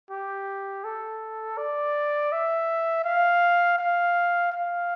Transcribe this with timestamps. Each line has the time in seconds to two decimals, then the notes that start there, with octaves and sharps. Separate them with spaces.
0.11 G4
0.84 A4
1.58 D5
2.32 E5
3.05 F5
3.79 F5
4.52 F5